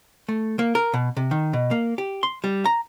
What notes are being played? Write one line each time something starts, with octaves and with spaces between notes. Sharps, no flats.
A3
A#3
A#4
B2
C3
D#3
B2
A#3
G4
C6
G3
A#5